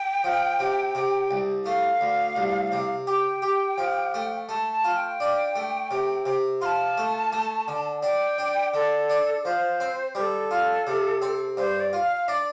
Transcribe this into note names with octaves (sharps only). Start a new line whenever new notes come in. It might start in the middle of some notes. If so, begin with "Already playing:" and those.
Already playing: G5
F3
C3
C3
C2
A3 F5
D2
C2
C3
G4 G5
G4
F3
A3
A3 A5
A5
F4
G5
D4
A3
C3
C3
F4 A5 C6
A3
A3
D3
D4 G5
D4
D3 A4
D4
F3 C5
C4
G3 C5
A4
F4
C3
C4
G2 C5
D5
F4
F5
D4 D5